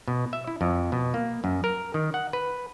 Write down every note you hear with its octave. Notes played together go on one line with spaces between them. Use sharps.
B2
E5
E4
F2
B2
A#3
F#2
A#4
D#3
F#5
B4